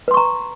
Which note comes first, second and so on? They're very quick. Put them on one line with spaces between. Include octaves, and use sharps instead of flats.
B4 C6 C#6 A#5